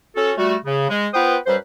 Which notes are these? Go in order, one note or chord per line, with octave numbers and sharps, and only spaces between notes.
C#4 F#4 A4
G3 A3 F#4
C#3
G#3
B3 F4 B4 C5 G5 D#6
F#2 G3 B4 C5